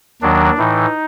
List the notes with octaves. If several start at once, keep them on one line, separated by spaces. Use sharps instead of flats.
D#2 D#3 F#3 D4
A2 E3 D#4